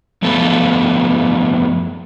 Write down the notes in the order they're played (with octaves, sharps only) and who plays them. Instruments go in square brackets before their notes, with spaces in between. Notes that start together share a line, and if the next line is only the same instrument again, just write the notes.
[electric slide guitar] F#2 F3 A3 B3 A4